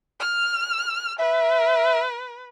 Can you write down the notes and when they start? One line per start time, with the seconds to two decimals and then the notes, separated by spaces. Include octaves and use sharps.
0.20 F6
1.19 B4 E5